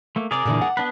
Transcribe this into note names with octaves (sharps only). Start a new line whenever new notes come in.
A3 A#3
C3 G#4 A#4 D5
A#2 D3 E3
F#5
B3 D4 B4